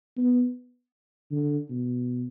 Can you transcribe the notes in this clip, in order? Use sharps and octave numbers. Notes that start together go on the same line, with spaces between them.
B3
D3
B2